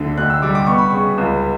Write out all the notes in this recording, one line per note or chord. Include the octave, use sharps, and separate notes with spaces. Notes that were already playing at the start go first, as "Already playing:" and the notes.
Already playing: D2 D3
D2 F#6
E6
G3 D6
D6
B3 C#6
B5
C#3 C#6
C#2